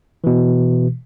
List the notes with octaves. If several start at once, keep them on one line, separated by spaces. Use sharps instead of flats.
B2 E3